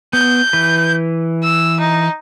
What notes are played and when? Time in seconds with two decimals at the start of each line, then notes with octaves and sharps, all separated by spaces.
0.13 B3 G6
0.53 E3 B4
1.43 E6
1.80 D#4